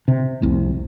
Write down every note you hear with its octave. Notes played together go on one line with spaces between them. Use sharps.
C3
F1 C2